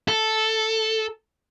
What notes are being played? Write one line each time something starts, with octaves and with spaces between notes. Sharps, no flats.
A4